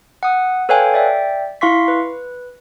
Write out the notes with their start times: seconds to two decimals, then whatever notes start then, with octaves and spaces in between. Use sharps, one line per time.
0.23 F#5 D#6
0.69 A4 B4 C#5 F5 G5 G#5
0.94 D5 E5 G5
1.61 E4 F5 C6 C#6 B6
1.88 B4